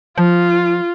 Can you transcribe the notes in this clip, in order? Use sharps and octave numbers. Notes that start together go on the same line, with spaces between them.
F3 F4